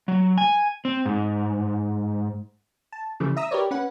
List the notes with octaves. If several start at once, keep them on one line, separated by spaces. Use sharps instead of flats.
F#3
G#5
C4
G#2
A5
C#3 E3 F3 G3 A3
E5 A#5 D#6 E6
G4 A#4 B4 C#5 D5
C#4 B4 F#5